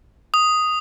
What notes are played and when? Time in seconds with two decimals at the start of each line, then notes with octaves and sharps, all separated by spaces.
0.34 D#6